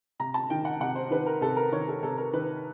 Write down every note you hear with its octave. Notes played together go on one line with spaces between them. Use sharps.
C3 A#5
A5
D#3 G5
F#5
C3 F#5
C5
D#3 B4
A#4
C3 A4
A#4
D#3 C#5
A4
C3 A4
A#4
D#3 B4